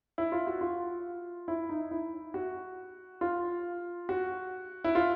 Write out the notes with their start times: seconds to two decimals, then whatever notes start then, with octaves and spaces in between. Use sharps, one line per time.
0.18 E4
0.32 F4
0.47 F#4
0.61 F4
1.48 E4
1.69 D#4
1.91 E4
2.34 F#4
3.21 F4
4.09 F#4
4.84 E4
4.95 F4